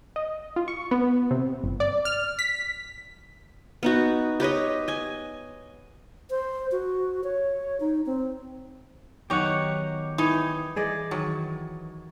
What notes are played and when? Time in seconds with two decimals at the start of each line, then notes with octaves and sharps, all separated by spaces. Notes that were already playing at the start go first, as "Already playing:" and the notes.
0.16 D#5
0.56 F4
0.68 C#6
0.91 B3
1.31 C3
1.64 G1
1.80 D5
2.05 F6
2.39 B6
3.83 B3 D#4 F#4
4.40 G4 B4 C#5 D#5
4.88 D#5 G#5
6.30 C5
6.72 F#4
7.24 C#5
7.80 D#4
8.06 C4
9.30 D#3 F#3 B3 D#4 G4 C#5 F#5
10.18 E3 D#4 C#5
10.76 E3 G#4 D5 D#5
11.11 D#3 F#3